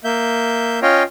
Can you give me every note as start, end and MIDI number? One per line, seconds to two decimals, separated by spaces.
0.04 0.80 58
0.04 0.80 76
0.04 0.80 91
0.82 1.03 61
0.82 1.03 65
0.82 1.03 73
0.82 1.03 75
0.82 1.03 77
0.82 1.03 79